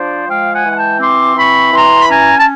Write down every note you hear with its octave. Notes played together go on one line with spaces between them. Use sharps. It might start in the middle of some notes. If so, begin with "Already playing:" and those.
Already playing: F3 D4 C5 D5
G#3 F5 G5
F#5 G#5
E3
G#5
G5 A5
C4 C6 D6
E3 B5 C#6
E3 A#5 C6
B5
C#4 G#5 A#5
A5